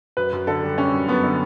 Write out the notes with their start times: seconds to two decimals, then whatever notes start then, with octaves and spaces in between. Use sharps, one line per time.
0.17 F#2 B4
0.33 F#2
0.47 D3 A4
0.63 G3
0.78 G3 C#4
0.93 F#2
1.08 F#2 B3
1.24 D3